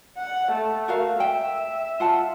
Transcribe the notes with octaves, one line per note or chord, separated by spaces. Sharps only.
F#5
A3
F#4 A#4 F5
E5 G5
F4 F#5 A5